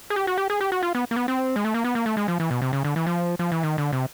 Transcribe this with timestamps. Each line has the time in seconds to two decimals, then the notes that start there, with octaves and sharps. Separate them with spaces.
0.10 G#4
0.16 G4
0.27 F#4
0.38 G4
0.50 G#4
0.61 G4
0.72 F#4
0.83 F4
0.95 B3
1.11 A#3
1.16 B3
1.28 C4
1.56 G#3
1.65 A3
1.74 A#3
1.84 B3
1.95 A#3
2.06 A3
2.17 G#3
2.28 F3
2.40 E3
2.51 B2
2.62 C3
2.73 C#3
2.85 D3
2.96 E3
3.07 F3
3.39 F3
3.52 E3
3.63 D#3
3.78 D3
3.93 C3